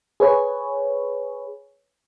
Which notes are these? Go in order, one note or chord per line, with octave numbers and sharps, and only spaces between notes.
G#4 B4 C#5